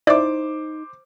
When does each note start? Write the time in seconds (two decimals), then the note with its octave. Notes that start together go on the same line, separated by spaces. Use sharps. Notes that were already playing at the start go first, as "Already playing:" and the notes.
0.07 D#4 E4 C5 D5 D6